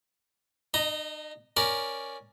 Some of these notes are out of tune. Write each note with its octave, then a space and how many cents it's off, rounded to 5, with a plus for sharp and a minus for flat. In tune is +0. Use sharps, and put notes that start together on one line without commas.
D#4 -40 D#5 +0 A#5 +0
C#4 +0 A#4 +0 D5 +0